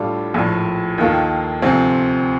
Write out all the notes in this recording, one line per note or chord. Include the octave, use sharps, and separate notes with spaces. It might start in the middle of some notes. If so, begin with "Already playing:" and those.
Already playing: A2 G3 D4 F4 A4
A#1 A2 F3
D#2 D#3 A#3 F4 A4
D2 C3 F3 C4